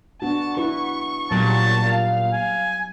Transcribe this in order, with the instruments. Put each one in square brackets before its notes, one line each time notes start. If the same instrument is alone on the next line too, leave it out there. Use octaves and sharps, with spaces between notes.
[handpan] B3 D4 F#4 [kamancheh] A5
[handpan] E4 F#4 B4 [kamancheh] C#6
[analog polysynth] A#2 [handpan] F#3 G3 B3 [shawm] A5
[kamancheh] F5
[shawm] G#5